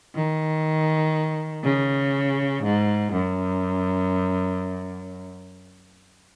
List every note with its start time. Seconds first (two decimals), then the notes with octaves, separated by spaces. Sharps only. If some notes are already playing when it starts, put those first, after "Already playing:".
0.15 D#3
1.64 C#3
2.64 G#2
3.13 F#2